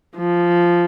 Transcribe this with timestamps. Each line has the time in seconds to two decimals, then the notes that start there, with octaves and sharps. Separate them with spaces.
0.17 F3